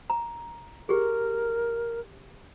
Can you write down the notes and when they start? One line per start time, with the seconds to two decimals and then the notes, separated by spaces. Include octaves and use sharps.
0.10 A#5
0.89 G4 G#4 A#4